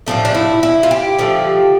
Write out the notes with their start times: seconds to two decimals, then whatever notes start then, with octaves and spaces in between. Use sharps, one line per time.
0.07 A2 F3 A3 D4
0.25 D4
0.35 E4
0.63 E4
0.83 F4
0.91 G4
1.19 D3 F3 A3